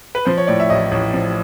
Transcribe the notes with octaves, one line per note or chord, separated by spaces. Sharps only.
B4
F3 C5
C#5
A2 D5
E5
A1 D#5
A1
F3